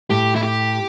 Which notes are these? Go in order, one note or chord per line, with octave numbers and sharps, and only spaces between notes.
A2 G4
E4
G4